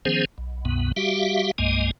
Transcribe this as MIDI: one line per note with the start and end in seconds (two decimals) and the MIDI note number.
0.05 0.25 51
0.05 0.25 53
0.05 0.25 59
0.05 0.25 61
0.05 0.25 68
0.05 0.25 72
0.38 0.65 35
0.65 0.92 36
0.65 0.92 42
0.65 0.92 47
0.65 0.92 59
0.96 1.51 55
0.96 1.51 66
0.96 1.51 67
0.96 1.51 76
0.96 1.51 77
1.58 1.91 36
1.58 1.91 43
1.58 1.91 56
1.58 1.91 58
1.58 1.91 75
1.58 1.91 80